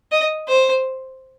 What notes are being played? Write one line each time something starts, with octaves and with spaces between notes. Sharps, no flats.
D#5
C5